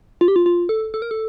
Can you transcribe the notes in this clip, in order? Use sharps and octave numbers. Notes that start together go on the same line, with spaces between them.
F4
G4
F4
F4
A4
A4
A#4
A4